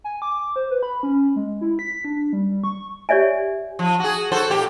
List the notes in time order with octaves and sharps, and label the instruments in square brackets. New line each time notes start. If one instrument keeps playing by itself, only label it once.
[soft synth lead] G#5
D6
C5
B4
B5
C#4
G#3
E4
B6
D4
G3
C#6
[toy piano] G4 C#5 D5 E5 G#5
[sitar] F3
F#4 G#4
F#4 A4 C5
A#2 G4